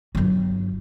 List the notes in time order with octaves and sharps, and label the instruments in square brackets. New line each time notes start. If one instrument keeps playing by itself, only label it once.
[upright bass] G1 F#3